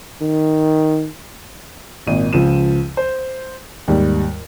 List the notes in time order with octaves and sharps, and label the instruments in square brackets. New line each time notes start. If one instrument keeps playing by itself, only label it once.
[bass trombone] D#3
[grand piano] G#1 A#2 D#5 D#7
C#2 F3 D#7 E7
C5
D#2 G#2 G3